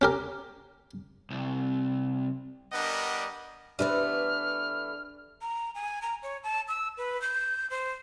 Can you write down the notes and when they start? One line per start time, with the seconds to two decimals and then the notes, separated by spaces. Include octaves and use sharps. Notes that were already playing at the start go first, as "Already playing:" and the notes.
0.01 C#4 G4 A#4
1.30 C2
2.73 G3 B3 D4 A#4 D#5 F#5
3.79 E3 A3 B3 D4 G4 B4 C5 F6
5.42 A#5
5.75 G#5
6.02 A#5
6.23 C#5
6.43 A5
6.68 E6
6.97 B4
7.22 G6
7.70 C5